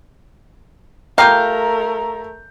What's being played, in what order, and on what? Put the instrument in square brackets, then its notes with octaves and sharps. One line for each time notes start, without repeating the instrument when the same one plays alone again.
[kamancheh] A3 A#4 [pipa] F4 G4 F5 [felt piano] A#5 G6